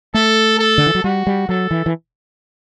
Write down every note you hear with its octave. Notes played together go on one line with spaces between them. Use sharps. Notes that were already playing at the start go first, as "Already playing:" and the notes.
A3 A4
A4
D3
E3
F#3
G3 F#4
G3
F#3 A4
E3
E3